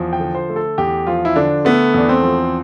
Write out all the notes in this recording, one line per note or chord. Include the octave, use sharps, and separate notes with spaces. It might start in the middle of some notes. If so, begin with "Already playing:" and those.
Already playing: E2 F3
G5
D3
C5
A3
A4
E2 G4
F3 F4
E4
D3 D4
A3 B3
E2 D4
C4
F3